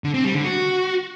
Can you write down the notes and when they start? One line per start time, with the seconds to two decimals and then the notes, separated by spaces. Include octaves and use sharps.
0.04 D3
0.14 C4
0.24 G3
0.34 D3
0.45 F#4